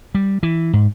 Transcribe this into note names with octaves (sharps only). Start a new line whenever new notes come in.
G3
E3
G#2